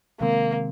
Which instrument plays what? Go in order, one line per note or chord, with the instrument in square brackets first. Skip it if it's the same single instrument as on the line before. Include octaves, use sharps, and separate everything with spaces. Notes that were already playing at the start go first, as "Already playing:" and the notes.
[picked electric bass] C3 D#3 G#3 C4 [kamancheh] A#3